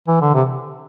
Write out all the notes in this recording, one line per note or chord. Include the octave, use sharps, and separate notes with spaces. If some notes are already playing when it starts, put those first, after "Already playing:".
E3
D3
C3